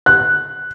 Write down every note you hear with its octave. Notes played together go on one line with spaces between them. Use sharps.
F#6